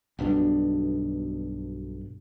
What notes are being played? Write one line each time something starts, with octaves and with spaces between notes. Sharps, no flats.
B1 G2 B2 D4